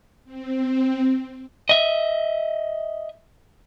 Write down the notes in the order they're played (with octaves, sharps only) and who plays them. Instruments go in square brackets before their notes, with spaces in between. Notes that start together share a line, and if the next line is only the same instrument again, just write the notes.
[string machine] C4
[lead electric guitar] D#5 E5